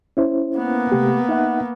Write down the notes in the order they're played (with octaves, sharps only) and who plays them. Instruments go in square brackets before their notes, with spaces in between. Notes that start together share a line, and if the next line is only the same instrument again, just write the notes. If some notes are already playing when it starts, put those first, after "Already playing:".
[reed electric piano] C#4 E4 C5
[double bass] A#3 B3
[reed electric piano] C3 A3 G4
D#4 E5 F#5